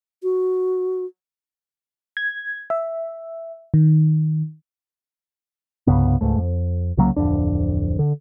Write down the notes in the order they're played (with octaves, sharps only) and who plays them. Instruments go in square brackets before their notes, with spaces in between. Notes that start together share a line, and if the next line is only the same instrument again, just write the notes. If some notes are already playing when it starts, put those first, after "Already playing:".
[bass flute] F#4
[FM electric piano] G#6
E5
D#3
[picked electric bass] C2 G2 C#3 B3
C#2 G#2 A3
F2
C2 C#3 F#3 A#3
D1 G1 F2 D4
D3